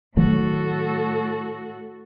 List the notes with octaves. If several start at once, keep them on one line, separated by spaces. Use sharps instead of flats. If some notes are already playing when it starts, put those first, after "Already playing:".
A2 D#3 F#3 A3 F#4 A4